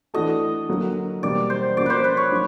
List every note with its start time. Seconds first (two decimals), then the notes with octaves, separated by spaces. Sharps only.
0.14 E3 A3 D4 F#4 A4 D#5
0.69 D3 F#3 A#3
1.22 E2 B2 G3 A#3 D5
1.50 C5
1.76 F3 A#3 C#4 F#4 A#4 D5
1.86 B4 C5
2.04 B4
2.17 C#5
2.31 F#3 A#3 D#4